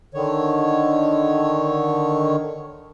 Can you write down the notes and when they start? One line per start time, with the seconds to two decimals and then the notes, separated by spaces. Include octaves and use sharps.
0.14 D3 D#3 C#5